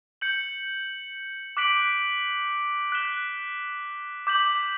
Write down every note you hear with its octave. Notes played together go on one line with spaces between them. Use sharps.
G6 C#7 F#7
D6 F#6 B6 D7 F#7
F#6 B6 E7 G7
D6 G6 B6 F#7